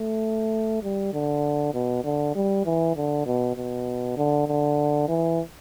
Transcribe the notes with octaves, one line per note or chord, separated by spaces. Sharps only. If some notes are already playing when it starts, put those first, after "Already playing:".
Already playing: A3
G3
D3
B2
D3
G3
E3
D3
B2
B2
D3
D3
E3